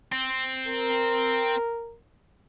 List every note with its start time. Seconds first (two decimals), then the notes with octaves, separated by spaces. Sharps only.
0.12 C4
0.68 A#4